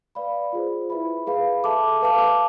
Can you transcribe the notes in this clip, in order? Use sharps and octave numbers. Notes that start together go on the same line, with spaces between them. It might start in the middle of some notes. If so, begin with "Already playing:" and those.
B4 D5 F5 B5
F4 G#4 C5
E4 B4 E5 B5
G#4 B4 F5 B5
A4 E5 A5 D6
B4 F5 A5 D6